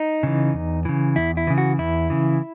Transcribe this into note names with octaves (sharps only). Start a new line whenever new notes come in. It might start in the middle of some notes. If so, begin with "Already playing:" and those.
Already playing: D#4
C#3 E3
E2
C#3 E3
E2 E4
E4
C#3 E3
F#4
E2 E4
C#3 E3